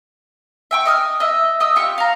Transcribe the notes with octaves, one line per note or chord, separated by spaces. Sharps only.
E5 G5 C#6
D#5 D#6 F6
D#5 E5
D#5 D#6 E6
F4 G4 C#6
F5 A#5